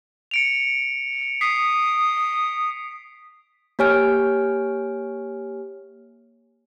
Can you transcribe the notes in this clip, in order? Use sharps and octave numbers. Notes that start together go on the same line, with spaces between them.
C#7 D7 F7
D#6 B6 C7
A#3 G4 C#5 G#5 F6 D7